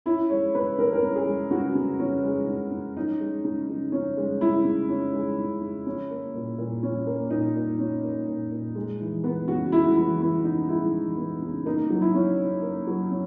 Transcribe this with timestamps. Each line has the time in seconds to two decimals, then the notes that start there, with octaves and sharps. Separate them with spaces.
0.06 C#4 E4
0.30 G#3 C#5
0.55 C#3 B4
0.78 C#3 A#4
0.85 B4
0.93 A#4
1.02 C#4
1.15 G#4
1.27 G#3
1.51 C#3 F#4
1.75 C#3
2.00 C#4
2.23 G#3
2.47 C#3
2.72 C#3
2.97 C#4 D#4
3.20 G#3
3.45 C#3
3.69 C#3
3.92 C#4
4.17 G#3
4.41 C#3 E4
4.65 C#3
4.89 C#4
5.13 G#3
5.38 C#3
5.61 C#3
5.87 C#4
6.11 A#3
6.34 A#2
6.58 A#2
6.83 C#4
7.07 A#3
7.30 A#2 D#4
7.55 A#2
7.79 C#4
8.04 A#3
8.28 A#2
8.51 A#2
8.75 G#3
9.00 E3
9.24 B3
9.48 C#3 F#4
9.72 G#3 E4
9.96 E3 E4
10.20 B3 E4
10.45 C#3 D#4
10.69 G#3 E4
10.93 E3
11.17 B3
11.42 C#3
11.65 A#3 D#4
11.90 F#3
12.01 E4
12.15 C#4
12.38 C#3
12.62 A#3
12.87 F#3
13.11 C#4